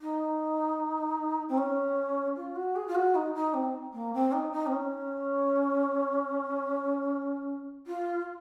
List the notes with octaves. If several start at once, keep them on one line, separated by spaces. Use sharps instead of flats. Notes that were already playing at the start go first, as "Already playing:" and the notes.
D#4
C4
C#4
F4
F#4
G#4
F4
F#4
D#4
D#4
C4
A#3
C4
D#4
D#4
C4
C#4
F4